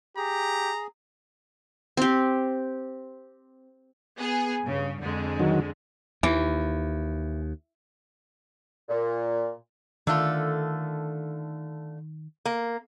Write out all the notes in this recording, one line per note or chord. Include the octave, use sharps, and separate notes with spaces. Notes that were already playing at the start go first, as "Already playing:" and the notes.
G4 G#4 A#5
C4 G4
B3 G#4
G2 C#3
F2 D3 G#3
D#3 F#3
D#2 E3
A#2
D3 D#3 A3 F4
A#3